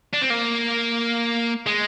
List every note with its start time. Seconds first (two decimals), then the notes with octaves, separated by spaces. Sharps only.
0.13 D4
0.21 C4
0.30 A#3
1.66 G#3